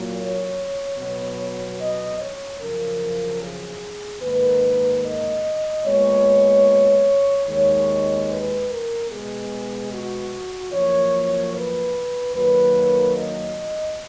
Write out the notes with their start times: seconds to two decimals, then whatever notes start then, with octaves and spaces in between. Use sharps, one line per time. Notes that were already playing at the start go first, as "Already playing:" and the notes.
Already playing: A#2 F#3 A#3
0.16 C#5
0.98 B2 F#3 B3
1.80 D#5
2.19 C#5
2.60 F#2 C#3 F3 A#4
3.41 G#4
4.22 G#2 D#3 A#3 B4
5.04 D#5
5.85 A#2 G#3 B3 C#5
7.48 D#2 D#3 G#3
8.29 B4
8.69 A#4
9.10 B2 G#3 B3 G#4
9.91 F#4
10.73 F#2 F3 A#3 C#5
11.54 B4
12.35 F#2 D#3 F#3 A#3 B4
13.17 D#5